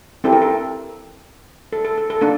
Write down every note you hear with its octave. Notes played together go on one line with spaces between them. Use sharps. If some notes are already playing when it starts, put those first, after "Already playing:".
C4 E4 G4 A4
A#4
A4
A4
A4
A4
A4
A#3 D4 A4